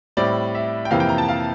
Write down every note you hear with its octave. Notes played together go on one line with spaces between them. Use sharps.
A2 G3 C4 E4 D5
E5
G5
F2 C3 E3 A#3 F5
G5
A#5
A5
F5